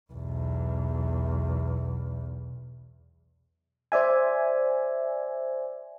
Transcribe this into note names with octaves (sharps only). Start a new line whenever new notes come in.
B1 E2
C5 D5 E5 G#5